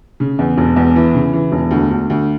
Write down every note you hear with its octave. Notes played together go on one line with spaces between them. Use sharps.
C#3
E2
E1
E2
E3
C#3
E3
E1
D2
D2
D2